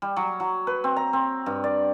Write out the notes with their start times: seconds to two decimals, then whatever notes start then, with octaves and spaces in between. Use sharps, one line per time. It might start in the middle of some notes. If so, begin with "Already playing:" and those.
0.02 G3
0.16 F#3
0.40 F#3
0.67 B4
0.84 C4
0.96 A#5
1.13 C4
1.46 G2
1.64 D5